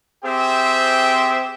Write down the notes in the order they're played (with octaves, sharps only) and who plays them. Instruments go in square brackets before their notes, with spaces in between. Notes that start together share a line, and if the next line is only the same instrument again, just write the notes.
[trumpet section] C4 G4 G#4 C5 E5 G5